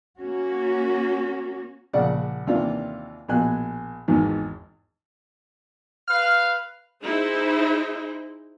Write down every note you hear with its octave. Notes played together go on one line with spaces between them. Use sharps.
A#3 C#4 F#4
A#1 C#3 D5 F#5
D#2 C3 E3 D4 F4
A#1 B2 G#5 F#6
G#1 E2 G#2
B4 F5 F6
D#4 E4 G#4 C5